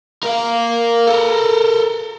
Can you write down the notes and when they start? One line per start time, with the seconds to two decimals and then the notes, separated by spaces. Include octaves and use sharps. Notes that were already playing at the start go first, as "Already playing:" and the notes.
0.23 A#4 F5
1.07 A4 A#4